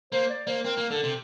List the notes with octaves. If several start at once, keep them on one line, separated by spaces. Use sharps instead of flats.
A#3 C5
D5
A#3 C5
C4 A#4
A#3
D3 A4
C3